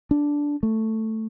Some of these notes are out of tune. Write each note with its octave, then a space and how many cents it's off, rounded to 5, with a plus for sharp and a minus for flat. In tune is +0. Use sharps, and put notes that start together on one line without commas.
D4 -10
A3 +5